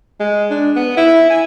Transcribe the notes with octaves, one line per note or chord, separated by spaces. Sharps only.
G#3
D4
B3
E4
G#5